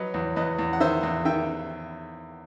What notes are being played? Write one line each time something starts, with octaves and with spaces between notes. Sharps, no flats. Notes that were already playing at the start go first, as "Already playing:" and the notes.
Already playing: F#3 B4 D#5
E2
E2 B4 D#5
E2
F#5
D#3 C5 E5
E2
D#3 E5 G5